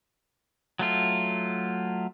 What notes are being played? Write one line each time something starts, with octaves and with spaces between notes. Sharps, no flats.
F#3 A3 F4